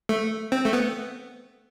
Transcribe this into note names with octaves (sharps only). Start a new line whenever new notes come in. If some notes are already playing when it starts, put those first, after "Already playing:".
A3
C4
A3
B3